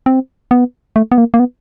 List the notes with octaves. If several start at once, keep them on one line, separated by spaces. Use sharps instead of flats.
C4
B3
A3
B3
A#3
A#3
B3